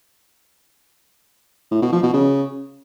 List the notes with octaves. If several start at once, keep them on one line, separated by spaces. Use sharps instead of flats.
A2
B2
F3
B2
C#3